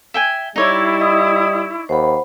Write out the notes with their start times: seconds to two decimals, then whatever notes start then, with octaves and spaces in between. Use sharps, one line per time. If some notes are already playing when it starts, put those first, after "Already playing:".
0.14 E5 G5 G#5
0.56 G3 D#4 E4 C#5 D5
0.99 D#5 D#6
1.89 D#2 C5 F#5 B5